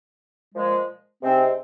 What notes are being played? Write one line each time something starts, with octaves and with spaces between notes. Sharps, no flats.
A#2 F3 G#3
C3 G#3 C4 D#4